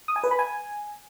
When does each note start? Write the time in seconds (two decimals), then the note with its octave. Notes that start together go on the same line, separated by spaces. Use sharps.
0.08 D#6
0.16 G#5
0.24 B4
0.31 B5
0.39 G#5